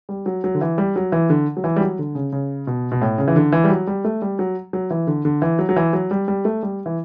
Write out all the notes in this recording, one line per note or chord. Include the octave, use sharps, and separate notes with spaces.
G3
F#3
F#3
D3
E3
G3
F#3
E3
D3
F#3
E3
G3
F#3
D3
C#3
C#3
B2
B2
A2
C#3
E3
D3
E3
G3
F#3
G3
A3
G3
F#3
F#3
E3
D3
D3
E3
F#3
F#3
E3
F#3
G3
G3
A3
G3
E3